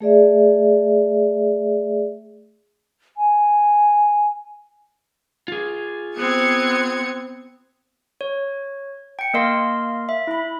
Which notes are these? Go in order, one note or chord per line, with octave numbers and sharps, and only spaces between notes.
A3 G#4 D5 E5
G#5
F4 G#4
B3 C4 G#6 C#7
C#5
G5 C#7
A#3 A#4 D#5 F5 C6
E5
E4 B5